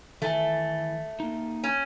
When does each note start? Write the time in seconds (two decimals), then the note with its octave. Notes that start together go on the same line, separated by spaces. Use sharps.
0.22 D#3 E3 A3 G#5
1.20 A#3 D#4
1.64 C#4